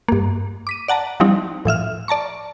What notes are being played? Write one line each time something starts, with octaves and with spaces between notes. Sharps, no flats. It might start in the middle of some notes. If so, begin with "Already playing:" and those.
G2 A#3
D6 B6 D#7
D5 F#5 A5 A#5
F3 G3 C4 D#4 E4
A2 F3 E5 F6
D5 A5 A#5 C#6